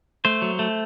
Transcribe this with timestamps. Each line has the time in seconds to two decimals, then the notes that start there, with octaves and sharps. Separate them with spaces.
0.25 A3 C5
0.42 F#3
0.59 A3